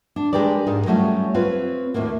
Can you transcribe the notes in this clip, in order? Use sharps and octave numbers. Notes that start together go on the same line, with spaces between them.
D4
G#3 D4 G4 A#4 B4 D5
G#2 D#4 A#4
F#3 G3 A3 C#4 F4
C4 F4 B4 C#5
D#2 A2 A3 A#3